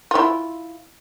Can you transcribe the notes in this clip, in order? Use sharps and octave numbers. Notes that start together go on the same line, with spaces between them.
E4 F4